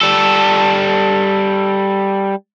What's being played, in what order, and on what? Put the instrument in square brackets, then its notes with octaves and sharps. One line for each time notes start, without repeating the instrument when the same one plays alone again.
[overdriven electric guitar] G3 A4